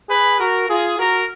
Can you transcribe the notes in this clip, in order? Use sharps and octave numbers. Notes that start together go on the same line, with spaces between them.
G#4 B4
F#4 A#4
F4 G#4
F#4 A#4